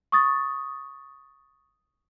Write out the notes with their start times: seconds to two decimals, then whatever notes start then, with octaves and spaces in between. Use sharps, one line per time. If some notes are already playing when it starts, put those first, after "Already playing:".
0.12 C#6 D#6 A6